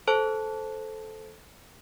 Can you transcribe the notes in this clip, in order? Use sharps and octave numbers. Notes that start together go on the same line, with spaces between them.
A4 C5 A5 F#6